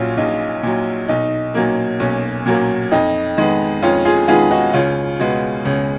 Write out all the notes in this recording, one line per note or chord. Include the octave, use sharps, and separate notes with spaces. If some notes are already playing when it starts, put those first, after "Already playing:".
Already playing: A#1 A#2 F#3 C#4 F4
A#1 D#4
A#2 F#3
B1 D#4
A#2 F#3 A#3
B1 C#4
A#2 F#3 A#3
F2 D#4
D#3 G#3 B3
F2 C#4 F4
F4 G#4
D#3 G#3 B3 F4 G#4
D#4 F#4
C#2 C#4 F4
B2 G#3 B3
C#2 C#4